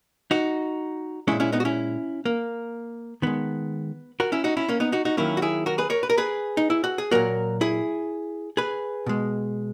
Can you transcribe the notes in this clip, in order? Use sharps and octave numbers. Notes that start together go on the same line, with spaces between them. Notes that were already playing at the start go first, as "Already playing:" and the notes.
D#4 F#4
A#2 G#3 C#4 E4
C#4 E4
B3 D#4
F#4
C#4 E4
A#3
D#3 G#3 B3
F#4 A#4
C#4 E4
D#4 F#4
C#4 E4
A#3 C#4
B3 D#4
D#4 F#4
D#4 F#4
D#3 F#3 A#3 C#4 E4
F#4
E4 G#4
F#4 A#4
G#4 B4
A#4 C#5
B4
A#4
G#4 B4
D#4
E4
F#4
G#4
A#2 F#3 A#3 F#4 A#4
E4 G#4
G#4 B4
B2 G#3